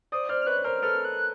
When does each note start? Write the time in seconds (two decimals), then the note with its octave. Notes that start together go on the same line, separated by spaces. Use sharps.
0.12 C5 D5 D#6
0.29 C5 D5 F6
0.42 F6
0.47 B4 C#5 F#6
0.57 B4
0.64 A#4 C5 F6
0.82 A4 B4 F6
1.05 F#6